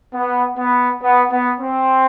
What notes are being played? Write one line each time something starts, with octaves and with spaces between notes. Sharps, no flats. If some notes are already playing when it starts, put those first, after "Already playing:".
B3
B3
B3
B3
C4